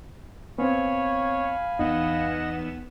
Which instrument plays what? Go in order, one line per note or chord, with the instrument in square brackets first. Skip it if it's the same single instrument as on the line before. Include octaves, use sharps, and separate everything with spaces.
[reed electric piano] B3 C4 [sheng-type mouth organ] C#5 [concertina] F5 G#5 B5
[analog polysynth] E2 B3 E7 [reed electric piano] D#4 [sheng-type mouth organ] D#5 F#5